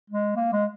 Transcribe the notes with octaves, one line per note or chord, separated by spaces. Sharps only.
G#3
A#3
G#3